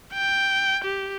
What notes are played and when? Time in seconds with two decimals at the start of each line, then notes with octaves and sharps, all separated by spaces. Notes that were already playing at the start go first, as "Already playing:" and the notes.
0.13 G5
0.84 G4